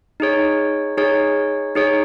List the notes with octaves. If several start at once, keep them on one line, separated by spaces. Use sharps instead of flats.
D#4 G#4 C#5
D#4 G#4 C#5
D#4 G#4 C#5